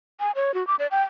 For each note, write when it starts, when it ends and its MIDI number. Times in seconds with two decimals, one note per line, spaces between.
0.20 0.31 80
0.35 0.54 73
0.54 0.66 66
0.67 0.75 86
0.79 0.87 74
0.91 1.02 79